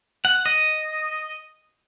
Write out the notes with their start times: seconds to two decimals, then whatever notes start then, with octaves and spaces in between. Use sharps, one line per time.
0.25 F#5
0.46 D#5